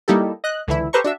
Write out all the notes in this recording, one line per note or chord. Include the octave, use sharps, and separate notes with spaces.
G3 A#3 D#4 E4 G4 A4
D#5 F#6
C#2 D3 E3 E4
G4 A4 B4 C5 A#5 C#6
D4 F#4 E5